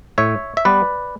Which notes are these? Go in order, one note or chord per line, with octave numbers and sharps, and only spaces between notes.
A2 C#5 E5
E5
G3 B3 B4 D5